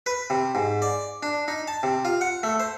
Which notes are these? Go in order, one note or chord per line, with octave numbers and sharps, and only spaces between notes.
B4
C3
G#2
D5
D4
D#4
A5
C3
F4
F#5
A3
C5